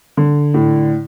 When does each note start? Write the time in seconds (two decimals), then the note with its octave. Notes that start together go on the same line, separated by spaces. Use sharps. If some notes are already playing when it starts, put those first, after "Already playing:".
0.17 D3
0.54 A2